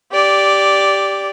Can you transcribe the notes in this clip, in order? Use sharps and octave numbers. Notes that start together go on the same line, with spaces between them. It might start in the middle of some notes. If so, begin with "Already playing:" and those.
G4 D5